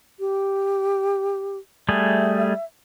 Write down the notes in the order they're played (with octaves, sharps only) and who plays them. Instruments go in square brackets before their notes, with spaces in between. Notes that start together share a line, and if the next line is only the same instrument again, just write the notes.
[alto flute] G4
[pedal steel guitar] G3 A3 G#4 [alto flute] E5